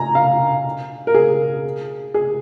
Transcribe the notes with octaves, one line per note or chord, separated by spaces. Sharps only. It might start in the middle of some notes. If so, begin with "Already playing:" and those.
Already playing: G#5 A#5
F5
A#4
G#4
G#4